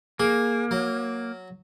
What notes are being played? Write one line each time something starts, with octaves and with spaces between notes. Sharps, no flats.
A#3 G#4
F#3